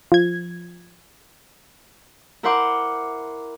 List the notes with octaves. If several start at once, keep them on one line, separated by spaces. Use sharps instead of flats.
F3 G#6
E4 A#4 C5 F#5 C6 D6